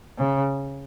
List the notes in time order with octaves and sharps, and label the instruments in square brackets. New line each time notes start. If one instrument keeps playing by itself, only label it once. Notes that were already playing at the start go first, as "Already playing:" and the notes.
[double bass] C#3